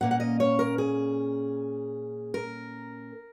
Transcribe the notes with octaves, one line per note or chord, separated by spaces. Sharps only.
A#2 A#3 C#4 F#5
F#5
D#5
C#5
A#4
G#4
A#4